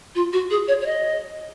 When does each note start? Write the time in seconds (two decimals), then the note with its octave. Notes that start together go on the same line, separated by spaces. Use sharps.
0.15 F4
0.32 F#4
0.50 G#4
0.68 C#5
0.81 C#5
0.85 D#5